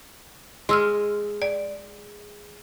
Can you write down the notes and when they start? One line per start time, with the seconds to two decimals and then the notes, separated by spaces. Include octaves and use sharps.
0.69 G#3 C6 E6 F6
1.42 D5